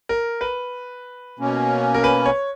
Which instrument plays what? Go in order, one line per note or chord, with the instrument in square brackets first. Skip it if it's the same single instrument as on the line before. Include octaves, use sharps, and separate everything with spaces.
[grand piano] A#4
B4
[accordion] B2 A#3 C#4
[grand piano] A#4
B4
C#5